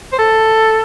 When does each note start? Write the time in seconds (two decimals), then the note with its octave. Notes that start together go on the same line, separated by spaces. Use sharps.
0.12 C5
0.19 A4